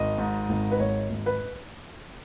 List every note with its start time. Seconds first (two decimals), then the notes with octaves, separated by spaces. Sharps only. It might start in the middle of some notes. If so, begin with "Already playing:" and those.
Already playing: G#1 D#5
0.18 G#2
0.49 G#1
0.72 B4
0.80 G#1 C#5
1.10 G#1
1.26 B4